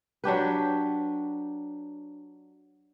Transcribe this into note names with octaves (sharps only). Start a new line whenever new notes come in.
F#3 D4 G4 B4